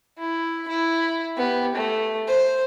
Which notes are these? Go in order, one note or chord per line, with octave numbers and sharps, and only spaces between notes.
E4
E4
B3 G4
A3
C5